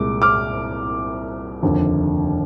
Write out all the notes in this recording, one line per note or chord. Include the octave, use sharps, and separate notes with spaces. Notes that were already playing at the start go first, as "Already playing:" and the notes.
Already playing: C2 A#2 G#3 D6
D6 F6
F1 D#2 D3 F3